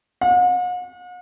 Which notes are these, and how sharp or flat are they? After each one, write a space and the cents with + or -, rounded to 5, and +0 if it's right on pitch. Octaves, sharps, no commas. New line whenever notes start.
F#5 -45